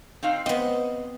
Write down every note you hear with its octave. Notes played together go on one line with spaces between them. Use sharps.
C4 D#4 F5
B3 C4 D#5